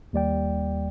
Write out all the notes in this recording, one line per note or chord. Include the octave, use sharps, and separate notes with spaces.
D#2 G3 D5 G5